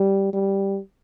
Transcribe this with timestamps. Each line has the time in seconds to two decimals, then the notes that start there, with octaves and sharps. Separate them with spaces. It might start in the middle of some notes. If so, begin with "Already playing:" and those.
Already playing: G3
0.33 G3